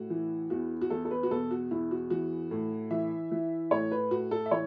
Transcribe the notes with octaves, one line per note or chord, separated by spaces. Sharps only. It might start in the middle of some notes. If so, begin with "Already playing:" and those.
Already playing: A2 F#4
E3
E2 F#4
F#4
E2 A4
A4
B4
F#4
B2 A4
F#4
E2 E4
F#4
E3 F#4
A2
E3 E5
E3
A2 C#5
B4
A2 F#4
A4
E5
E3 C#5